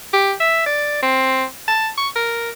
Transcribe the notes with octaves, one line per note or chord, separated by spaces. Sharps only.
G4
E5
D5
C4
A5
C#6
A#4